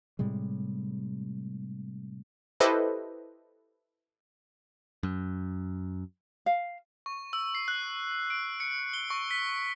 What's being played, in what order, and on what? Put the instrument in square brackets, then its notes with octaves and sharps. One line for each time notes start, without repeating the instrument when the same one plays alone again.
[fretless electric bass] A2 C3 G3 G#3
[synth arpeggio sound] E4 G4 A4 B4 C5 D#5
[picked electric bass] F#2
[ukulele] F5
[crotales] C#6
E6
C7
F#6
D7
C#7
G7
C#6
B6